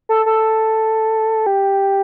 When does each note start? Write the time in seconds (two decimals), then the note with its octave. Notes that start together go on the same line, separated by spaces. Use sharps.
0.09 A4
0.26 A4
1.46 G4